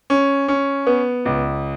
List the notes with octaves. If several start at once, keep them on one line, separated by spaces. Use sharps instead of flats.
C#4
C#4
B3
C#2